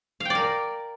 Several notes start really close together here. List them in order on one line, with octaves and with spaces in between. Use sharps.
F5 G5 D5 A#4